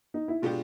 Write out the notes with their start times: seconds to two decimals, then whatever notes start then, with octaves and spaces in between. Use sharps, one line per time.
0.14 D#4
0.28 E4
0.42 B2 G#3 B3 D4 F4 G4